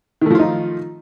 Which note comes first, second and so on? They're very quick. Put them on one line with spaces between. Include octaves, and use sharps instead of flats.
D#3 A3 F3 F4 D#4